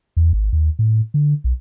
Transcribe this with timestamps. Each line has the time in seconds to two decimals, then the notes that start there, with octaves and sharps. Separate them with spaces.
0.17 E2
0.33 G#1
0.52 D#2
0.79 A2
1.14 D3
1.44 B1